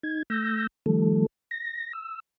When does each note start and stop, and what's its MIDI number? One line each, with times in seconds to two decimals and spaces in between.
0.03 0.23 63
0.03 0.23 92
0.30 0.67 57
0.30 0.67 88
0.30 0.67 91
0.30 0.67 94
0.86 1.26 51
0.86 1.26 53
0.86 1.26 55
0.86 1.26 57
0.86 1.26 69
1.51 1.93 94
1.93 2.20 88